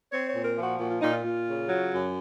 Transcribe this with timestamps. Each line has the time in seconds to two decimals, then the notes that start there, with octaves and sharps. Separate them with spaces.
0.11 C4 C#5
0.28 A#2 C#5
0.44 A#4
0.56 F3
0.62 F#4
0.78 A#2 F#4
0.89 F4
1.00 A#2 D#4
1.12 F4
1.23 A#2
1.46 C#3
1.68 F#3
1.91 F#2